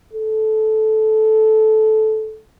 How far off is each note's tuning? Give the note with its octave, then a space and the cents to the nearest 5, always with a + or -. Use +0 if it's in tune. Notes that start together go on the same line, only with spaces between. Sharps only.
A4 -15